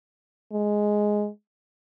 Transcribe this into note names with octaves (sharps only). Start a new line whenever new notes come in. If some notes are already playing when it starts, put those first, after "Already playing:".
G#3